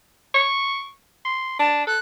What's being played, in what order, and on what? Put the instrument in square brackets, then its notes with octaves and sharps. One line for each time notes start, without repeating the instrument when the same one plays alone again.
[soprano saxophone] C#6
C6
[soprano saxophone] D4 [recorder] A5
[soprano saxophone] A4 [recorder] F#6